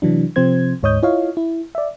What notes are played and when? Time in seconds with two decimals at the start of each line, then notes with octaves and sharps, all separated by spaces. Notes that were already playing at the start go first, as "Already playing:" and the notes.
0.02 C3 E3 F#3 D4
0.36 C3 F3 C4 C5 G#6
0.83 D2 G#2 C#5 D#5 D#6 G6
1.03 E4 F4 C#5 D#5 F5
1.37 E4
1.75 D5 E5